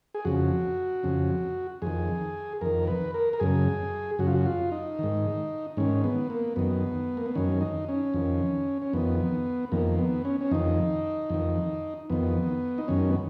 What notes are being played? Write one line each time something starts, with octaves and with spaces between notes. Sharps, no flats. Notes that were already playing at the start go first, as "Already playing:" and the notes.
G#4
F2 C#3 F#4
F2 C#3
F2 D#3 G#4
F2 D#3 A#4
B4
A#4
A#4
F#2 C#3 G#4
F#2 C#3 F#4
F4
F#4
F4
D#4
G#2 D#3
G#2 D#3 C#4
B3
A#3
F#2 D#3 B3
A#3
B3
F#2 D#3 C#4
D#4
C#4
F2 D#3
C#4
F2 D#3 B3
F2 D#3 A#3
B3
C#4
C#4
F2 D#3 D#4
F2 D#3
F2 D#3 B3
D#4
F#2 D#3 C#4
B3